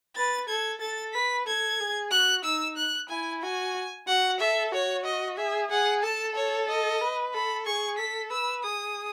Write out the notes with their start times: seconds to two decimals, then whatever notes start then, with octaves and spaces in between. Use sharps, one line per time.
0.16 B4 A6
0.48 A4 G#6
0.81 A4 A6
1.13 B4 B6
1.47 A4 G#6
1.80 G#4
2.11 F#4 F#6
2.44 D#4 E6
2.77 F#6
3.09 E4 G#5
3.42 F#4 G#5
4.08 F#4 F#5
4.40 A4 E5
4.72 F#4 C#5
5.05 D#5
5.37 G#4 E5
5.70 G#4 F#5
6.03 A4 A5
6.36 C#5
6.68 D#5
7.01 B4
7.33 A4 B5
7.66 G#4 C#6
7.98 A4 B6
8.31 B4 E6
8.63 G#4 D#6